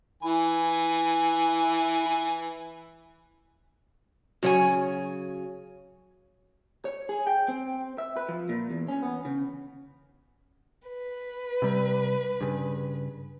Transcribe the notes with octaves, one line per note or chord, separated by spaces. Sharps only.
E3 E4 G#5
C#3 F#3 F#4 C#5 G#5
C#5
G#4
G5
C4
E5
B4
F3
A#2
E2
C#4
B3
C#3
B4
C3 G3
G2 C#3